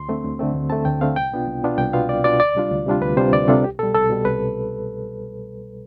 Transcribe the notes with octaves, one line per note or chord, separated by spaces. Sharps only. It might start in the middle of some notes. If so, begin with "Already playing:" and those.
Already playing: D2 C6
D3 A3 C4
D2
D3 A3 C4
D2
D3 A3 C4 A5
D2 G5
D3 A3 C4 F5
C2 G5
B2 B3 D4 F4
C2
B2 B3 D4 F4
C2 G5
B2 B3 D4 F4 F5
C2 D5
B2 B3 D4 F4 D5
D2 D5
C3 G3 D4 F4
D2
C3 G3 D4 F4
D2 B4
C3 G3 D4 F4 C5
D2 D5
C3 G3 D4 F4 A4
C2 G4
B2 G3 A4
C2 A4
B2 G3
C2 B4